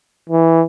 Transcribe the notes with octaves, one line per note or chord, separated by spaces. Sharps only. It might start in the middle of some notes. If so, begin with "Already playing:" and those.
E3